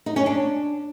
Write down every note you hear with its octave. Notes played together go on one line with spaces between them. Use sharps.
D#4
C#4
D4